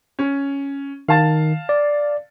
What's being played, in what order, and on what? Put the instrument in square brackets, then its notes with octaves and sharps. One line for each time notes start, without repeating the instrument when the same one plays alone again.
[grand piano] C#4
[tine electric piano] D#3 [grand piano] F5 A5 A6
[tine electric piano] D5